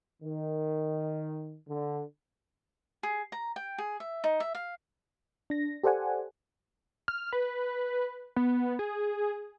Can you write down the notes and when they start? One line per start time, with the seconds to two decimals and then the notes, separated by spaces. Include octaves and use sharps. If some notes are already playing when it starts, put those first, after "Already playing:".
0.23 D#3
1.69 D3
3.03 G#4
3.32 A#5
3.56 G5
3.78 G#4
4.00 E5
4.24 D#4
4.40 E5
4.55 F5
5.50 D4 A#6
5.84 G4 A4 C5 D5 F#5 G#5
7.08 F6
7.32 B4
8.36 B3
8.79 G#4